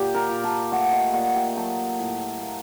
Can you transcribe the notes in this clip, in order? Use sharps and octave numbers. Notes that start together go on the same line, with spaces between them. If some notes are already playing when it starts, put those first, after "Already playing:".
Already playing: A#2 G4
A#4
A#2
A5
A3 F#5
D#5
A#2 F#5
G5
F#3 A5
A2
A#3